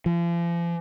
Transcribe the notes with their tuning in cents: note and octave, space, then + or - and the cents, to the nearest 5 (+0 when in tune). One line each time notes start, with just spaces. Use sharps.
F3 -40